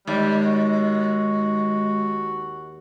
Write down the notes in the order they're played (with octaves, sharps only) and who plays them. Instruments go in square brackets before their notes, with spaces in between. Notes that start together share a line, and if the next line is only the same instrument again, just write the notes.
[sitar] D#2 [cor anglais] G3 [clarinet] G#3
[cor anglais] F#4